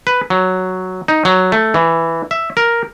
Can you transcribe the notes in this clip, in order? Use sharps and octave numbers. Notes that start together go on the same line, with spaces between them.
B4
F#3
D#4
F#3
A3
E3
E5
A#4